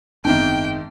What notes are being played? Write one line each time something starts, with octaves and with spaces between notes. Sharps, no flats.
F#1 G#2 D#3 B3 C4 D4 G5 A5